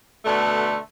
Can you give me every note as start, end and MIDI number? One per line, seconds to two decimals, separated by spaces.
0.25 0.76 47
0.25 0.76 50
0.25 0.76 57